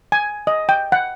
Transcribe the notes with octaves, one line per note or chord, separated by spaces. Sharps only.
G#5
D#5
G5
F#5